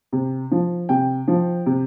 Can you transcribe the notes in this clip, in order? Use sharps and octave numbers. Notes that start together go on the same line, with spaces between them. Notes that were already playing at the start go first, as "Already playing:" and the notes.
C3
F3
C3 G5
F3
C3